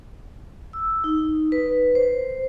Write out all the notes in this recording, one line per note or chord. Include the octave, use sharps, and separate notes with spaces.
E6
D#4
B4
C5